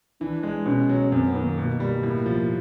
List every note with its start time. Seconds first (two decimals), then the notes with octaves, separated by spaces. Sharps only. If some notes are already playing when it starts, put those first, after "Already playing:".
0.20 E3 D4
0.43 G#3
0.66 B2 C#4
0.90 F#3
1.12 F#2 C4
1.28 B3
1.35 D#3
1.43 A#3
1.58 B2
1.80 G3
2.03 A2
2.26 F3